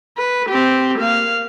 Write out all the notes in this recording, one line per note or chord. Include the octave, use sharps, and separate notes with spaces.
B4
C4 G4
A#3 F5